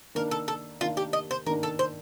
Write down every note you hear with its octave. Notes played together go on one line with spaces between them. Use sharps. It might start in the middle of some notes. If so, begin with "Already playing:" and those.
D#3 A#3 D4 A#4
A4
A4
D#3 A#3 D4 F4
G4
D#5
C5
D#3 A#3 D4 A#4
A4
C5